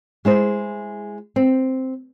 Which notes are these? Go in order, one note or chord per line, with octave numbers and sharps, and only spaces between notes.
G#3 E4 C5
C4